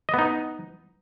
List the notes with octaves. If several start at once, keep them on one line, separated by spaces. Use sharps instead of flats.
B3 D#4 D#5